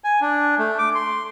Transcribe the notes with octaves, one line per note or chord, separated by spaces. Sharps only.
G#5
D4
A3
D6
C6